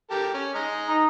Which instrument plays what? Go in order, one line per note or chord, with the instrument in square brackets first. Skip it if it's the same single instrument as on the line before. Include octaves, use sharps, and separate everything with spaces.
[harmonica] G4 A4 A#4
C#4
G#3 D#5 A#5
[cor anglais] D#4